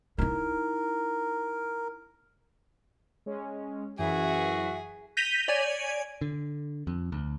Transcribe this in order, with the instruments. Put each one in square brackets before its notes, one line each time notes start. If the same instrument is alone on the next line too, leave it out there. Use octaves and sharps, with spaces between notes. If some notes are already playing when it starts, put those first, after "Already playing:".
[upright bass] D#4 E4 [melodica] A#4
[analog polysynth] G#3 C#4
[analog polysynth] F#2 E3 [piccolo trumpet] F#4 [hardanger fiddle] G#4 [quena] E5
[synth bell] G6 A#6 B6 D#7 F7 G7
C#5 D5 G#5 G#6 D#7
[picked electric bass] D3
F2
D2